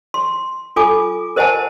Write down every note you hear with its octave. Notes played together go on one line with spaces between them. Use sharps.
C6
F4 A4 G#5 D6
A#4 C5 D#5 F#5 G#5 A5